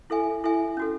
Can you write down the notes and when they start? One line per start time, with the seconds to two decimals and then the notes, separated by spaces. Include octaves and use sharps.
0.10 E4 A4 E5 G#5
0.44 E4 A4 E5 G#5
0.77 C#4 F#4 A4